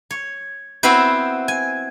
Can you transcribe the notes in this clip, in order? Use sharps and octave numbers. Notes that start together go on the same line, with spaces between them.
C#5
B3 C4 E4 F#4 B4 C5
G#5